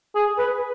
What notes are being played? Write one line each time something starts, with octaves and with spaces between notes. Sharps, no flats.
G#4
B4